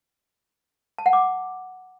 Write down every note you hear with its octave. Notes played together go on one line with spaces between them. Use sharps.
A5
F#5
D6